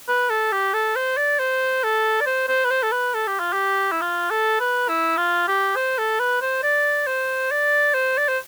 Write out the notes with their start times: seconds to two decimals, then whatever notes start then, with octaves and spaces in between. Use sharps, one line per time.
0.08 B4
0.30 A4
0.52 G4
0.74 A4
0.96 C5
1.17 D5
1.39 C5
1.83 A4
2.21 D5
2.26 C5
2.48 C5
2.64 B4
2.70 C5
2.83 A4
2.92 B4
3.14 A4
3.27 G4
3.40 F4
3.53 G4
3.92 E4
4.01 F4
4.31 A4
4.60 B4
4.89 E4
5.17 F4
5.47 G4
5.76 C5
5.98 A4
6.19 B4
6.41 C5
6.63 D5
7.07 C5
7.51 D5
7.94 C5
8.18 D5
8.28 C5